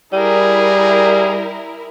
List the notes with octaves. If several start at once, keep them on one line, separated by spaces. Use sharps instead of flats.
G3 E4 G#4 A#4